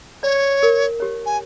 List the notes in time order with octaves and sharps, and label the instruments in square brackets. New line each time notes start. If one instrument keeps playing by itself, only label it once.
[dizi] C#5 [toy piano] D5
[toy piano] A#4
G4 C#5
[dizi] G#5